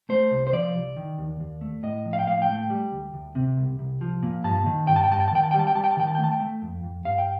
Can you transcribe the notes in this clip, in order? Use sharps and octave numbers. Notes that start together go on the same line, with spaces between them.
A3 C5
C2
C5
F3 D5
C2
D#3
D#2
D#2
A3
A2 D#5
F3
F5
G5
A2 F5
G5
A3
G3
D2
D2
C3
C2
C2
F3
A#2
G2 A5
D#3
G2 G5
A5
G5
G2 A5
G5
A5
D#3 G5
A5
G5
G3
A5
G5
G3 A5
G5
A5
D#3 G5
A5
G5
A3
A5
G5
A3
F2
F2
G2 F5
G5